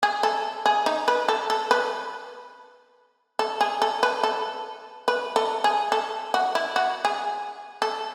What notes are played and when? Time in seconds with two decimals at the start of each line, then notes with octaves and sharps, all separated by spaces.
0.03 G#4
0.23 A4
0.66 G#4
0.86 D#4
1.08 B4
1.28 A4
1.50 A4
1.71 B4
3.39 A4
3.61 G#4
3.82 A4
4.03 B4
4.23 A4
5.08 B4
5.36 A4
5.64 G#4
5.92 A4
6.34 F#4
6.55 E4
6.76 F#4
7.05 G#4
7.82 A4